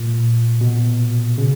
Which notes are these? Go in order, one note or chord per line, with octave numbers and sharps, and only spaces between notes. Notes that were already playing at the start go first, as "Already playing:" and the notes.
Already playing: A#2
B2
C#3